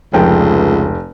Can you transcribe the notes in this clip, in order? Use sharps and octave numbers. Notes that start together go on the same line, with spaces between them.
F1 C#2 G5